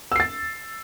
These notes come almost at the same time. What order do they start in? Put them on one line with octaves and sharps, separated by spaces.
E6 C7 A6